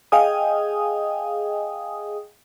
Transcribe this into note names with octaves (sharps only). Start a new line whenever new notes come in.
G#4 D#5 F5 G5 G#5 D#6